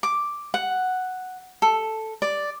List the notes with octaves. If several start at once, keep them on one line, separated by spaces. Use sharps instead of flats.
D6
F#5
A4
D5